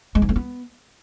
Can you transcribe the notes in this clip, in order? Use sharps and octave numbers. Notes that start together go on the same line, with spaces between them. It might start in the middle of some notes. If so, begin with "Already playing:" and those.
G#3
G#2
A3
B3